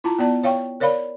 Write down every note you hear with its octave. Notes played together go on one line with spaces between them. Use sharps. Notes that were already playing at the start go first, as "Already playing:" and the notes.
E4 F4 A5 A#5
B3 D5 A5
C#5 F5 G5 C#6
A#4 C#5 D5 F5 B5